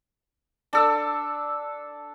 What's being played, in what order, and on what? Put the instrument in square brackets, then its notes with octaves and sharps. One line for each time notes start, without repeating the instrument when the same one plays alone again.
[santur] D4 A4 E6